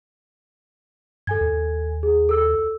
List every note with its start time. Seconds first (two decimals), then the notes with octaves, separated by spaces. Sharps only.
1.27 G2 A4 G#5 G#6
1.41 D#2
2.03 G#4
2.29 A4 E6